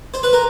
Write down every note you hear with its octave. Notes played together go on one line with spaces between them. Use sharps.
C5
B4
A#4